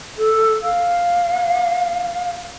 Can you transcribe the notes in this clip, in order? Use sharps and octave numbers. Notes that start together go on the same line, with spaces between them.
A4
F5